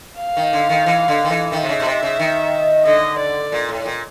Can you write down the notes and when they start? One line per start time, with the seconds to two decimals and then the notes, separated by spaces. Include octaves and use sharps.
0.19 F5
0.37 D#3
0.53 D3
0.69 D#3
0.86 E3
1.08 D3
1.24 D#3
1.30 E3
1.52 D#3 E5
1.63 C3
1.69 C#3
1.80 B2
1.86 C3
2.03 C#3
2.19 D#3
2.85 D3 D#5
3.19 D5
3.52 A#2
3.69 A2
3.85 A#2